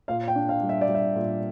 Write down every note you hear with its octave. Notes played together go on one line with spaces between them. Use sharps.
A#2 F5
G5
D4
F5
G3
E5
D5
G3
E5
A#2